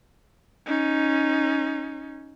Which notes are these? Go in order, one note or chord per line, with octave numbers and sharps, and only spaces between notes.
C#4 D#4